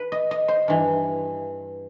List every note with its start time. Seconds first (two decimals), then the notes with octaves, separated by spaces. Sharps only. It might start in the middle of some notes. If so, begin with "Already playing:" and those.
Already playing: B4
0.12 D#5
0.31 D#5
0.48 C5
0.68 G2 E3